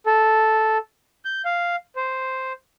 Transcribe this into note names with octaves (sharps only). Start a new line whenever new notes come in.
A4
G6
F5
C5